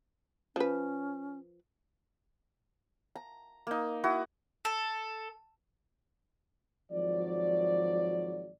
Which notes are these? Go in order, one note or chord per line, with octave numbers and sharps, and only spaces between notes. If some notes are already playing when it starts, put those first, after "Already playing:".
F3 C#4 B4
A#5
A#3 D#4
E4 F#4 D#6
A4
G#1 F3 F#3 D5